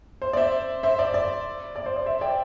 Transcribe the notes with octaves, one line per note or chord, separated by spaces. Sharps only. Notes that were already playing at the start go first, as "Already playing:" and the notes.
C5
D5
C5 E5
C5 E5
D5
D5
D5
C5
D5
C5 E5
D5 G5